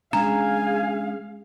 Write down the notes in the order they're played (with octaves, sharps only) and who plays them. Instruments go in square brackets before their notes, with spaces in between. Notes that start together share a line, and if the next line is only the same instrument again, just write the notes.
[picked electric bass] G#3 C#4 D4 [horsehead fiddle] G#4 F5 [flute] G#5 [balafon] A#5